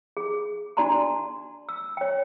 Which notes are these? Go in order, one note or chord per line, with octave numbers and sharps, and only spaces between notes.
G#4
D4 F#4 D5 A5 A#5 C6
E6
C#5 G5